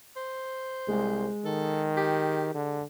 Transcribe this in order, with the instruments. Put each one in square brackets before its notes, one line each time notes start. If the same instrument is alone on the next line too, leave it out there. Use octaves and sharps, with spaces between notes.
[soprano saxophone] C5
[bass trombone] C2 [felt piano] G#3
[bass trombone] D#3 [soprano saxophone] A4
[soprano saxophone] G4
[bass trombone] D3